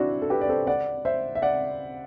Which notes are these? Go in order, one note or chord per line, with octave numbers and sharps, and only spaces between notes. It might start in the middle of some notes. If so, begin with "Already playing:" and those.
Already playing: C4 D4 E4 F#4
A4
G4 B4
D5
A4 C5
D5 F#5
C5 E5
E5
D5 F#5